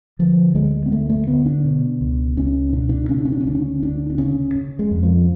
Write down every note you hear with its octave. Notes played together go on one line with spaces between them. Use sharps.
D3 F3
D2 G#3
B3
D2 A3
A3
D3 B3
D4
B2
C#2
C#2 C#4
B2 D4
D4
C#3 C#4
D4
C#4
D4
C#4
D2 D4
C#4
D2 D4
D4
C#3 C#4
C#3
G#3
F2
F3